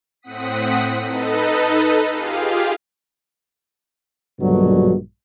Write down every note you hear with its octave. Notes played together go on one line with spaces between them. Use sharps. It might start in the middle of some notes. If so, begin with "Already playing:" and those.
A2 C4 F#5 D#6 B6
D#4 A4 B4 D#5
F4 G4 G#4 F5
A#1 G2 B2 D3 F#3